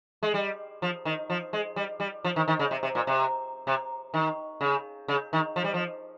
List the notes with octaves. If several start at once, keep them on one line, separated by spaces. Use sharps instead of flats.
G#3
G3
F3
D#3
F3
G#3
G3
G3
F3
D#3
D#3
C#3
C3
C3
A#2
C3
C3
D#3
C#3
C#3
D#3
F3
G3
F3